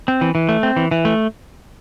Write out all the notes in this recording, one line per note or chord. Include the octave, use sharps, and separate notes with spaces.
C4
E3
E3
A3
C4
E3
E3
A3